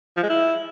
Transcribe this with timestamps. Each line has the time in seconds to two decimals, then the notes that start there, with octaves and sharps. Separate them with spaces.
0.17 F3
0.23 G#3
0.30 E4